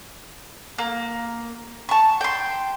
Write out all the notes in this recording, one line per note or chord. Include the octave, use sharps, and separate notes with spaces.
A#3
A5 C#6
G5 C6